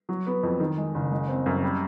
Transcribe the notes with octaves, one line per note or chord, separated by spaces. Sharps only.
F#3
B3
F2
D#3
G#3
F#1
G#3
C4
F#2
G3